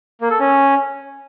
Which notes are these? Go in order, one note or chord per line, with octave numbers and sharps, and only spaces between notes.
A#3
A4
C#4